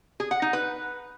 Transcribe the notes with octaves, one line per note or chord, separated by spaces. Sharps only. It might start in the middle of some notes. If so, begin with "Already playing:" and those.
G#4
F#5
D#4
B4